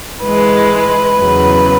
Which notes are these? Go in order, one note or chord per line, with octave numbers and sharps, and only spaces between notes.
G#2 E3 G#3 B4
E2 C#3 F#3